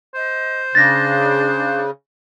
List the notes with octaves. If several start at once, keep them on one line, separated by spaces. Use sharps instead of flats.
C5 D#5
C#3 D4 F#6 A6 A#6